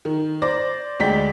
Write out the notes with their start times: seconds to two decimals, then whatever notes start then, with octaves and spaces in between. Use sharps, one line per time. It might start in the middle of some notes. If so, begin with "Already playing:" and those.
0.05 D#3
0.42 C5 D5 D6 A#6
1.00 D2 G#3 D5 G5 B6